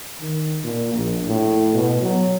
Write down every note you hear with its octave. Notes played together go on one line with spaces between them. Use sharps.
D#3
A#2
A#1
A2
B2
F#3